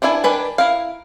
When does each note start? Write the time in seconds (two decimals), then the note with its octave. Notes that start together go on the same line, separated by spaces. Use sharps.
0.02 B3 D4 E4 E5 G#5
0.24 D#3 G3 D4 B4 G#5
0.58 E4 A#4 F5